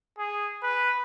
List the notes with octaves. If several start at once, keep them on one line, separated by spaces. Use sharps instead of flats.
G#4
B4